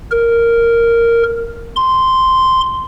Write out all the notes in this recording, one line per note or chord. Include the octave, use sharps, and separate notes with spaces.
A#4
C6